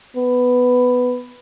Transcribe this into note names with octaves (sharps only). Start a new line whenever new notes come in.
B3